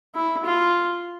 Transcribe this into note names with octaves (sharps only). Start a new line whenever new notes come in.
E4
F4